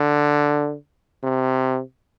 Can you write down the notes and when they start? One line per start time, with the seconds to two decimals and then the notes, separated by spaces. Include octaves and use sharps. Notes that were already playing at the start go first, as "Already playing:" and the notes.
Already playing: D3
1.23 C3